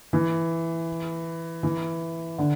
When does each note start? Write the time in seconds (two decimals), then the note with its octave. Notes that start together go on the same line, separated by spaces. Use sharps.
0.13 E3
1.63 E3
2.38 D3